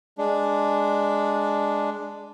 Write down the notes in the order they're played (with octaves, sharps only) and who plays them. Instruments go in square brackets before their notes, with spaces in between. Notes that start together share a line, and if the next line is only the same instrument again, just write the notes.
[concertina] G#3 D4